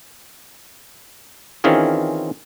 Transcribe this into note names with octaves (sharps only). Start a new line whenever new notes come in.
D#3 E3 C4 C#4 F4 G#4